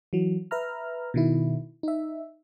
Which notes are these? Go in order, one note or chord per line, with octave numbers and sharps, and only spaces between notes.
E3 F#3
B4 E5 A#5 F6
B2 D#3 E4
D#4 E5